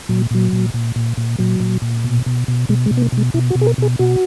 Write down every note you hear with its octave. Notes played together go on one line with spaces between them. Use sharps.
A#2 F#3
A#2 F#3
A#2
A#2
A#2
A#2
A#2 F#3
A#2
A#2
B2
B2
B2
B2 G#3
G#3
B2
B3
A#3
B2
G#3
B2 E4
F#4
B2
G#4
A#4
B2 G#4
B2 F#4